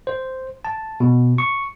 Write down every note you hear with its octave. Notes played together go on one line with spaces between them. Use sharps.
C5
A5
B2
C#6